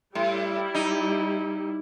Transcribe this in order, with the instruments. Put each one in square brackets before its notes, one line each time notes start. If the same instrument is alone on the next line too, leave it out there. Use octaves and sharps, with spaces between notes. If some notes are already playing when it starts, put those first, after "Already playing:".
[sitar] A2 [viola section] G3 E4
[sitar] D#4